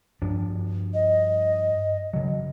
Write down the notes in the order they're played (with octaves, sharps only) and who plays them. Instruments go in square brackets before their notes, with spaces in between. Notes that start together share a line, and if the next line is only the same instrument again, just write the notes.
[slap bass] G2 F3 D4
[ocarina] D#5
[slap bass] C#3 F#3